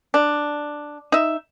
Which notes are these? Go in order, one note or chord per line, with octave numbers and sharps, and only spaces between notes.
D4
D#4 E5